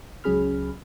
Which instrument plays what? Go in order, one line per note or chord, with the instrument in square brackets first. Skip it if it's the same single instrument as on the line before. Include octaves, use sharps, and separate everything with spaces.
[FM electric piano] C#2 F#3 C#4 G#4 B5 F6